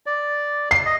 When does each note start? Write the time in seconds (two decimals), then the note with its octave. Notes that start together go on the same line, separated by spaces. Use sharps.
0.06 D5
0.71 C7
0.86 D#5